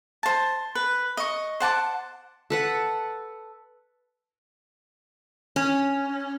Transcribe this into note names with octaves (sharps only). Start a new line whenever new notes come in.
C5 A5
B4
D#5 C#6
C5 F#5 A5 D6
A4 B4 F#5
C#4